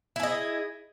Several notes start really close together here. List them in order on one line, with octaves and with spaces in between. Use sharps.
E4 G#4 D#5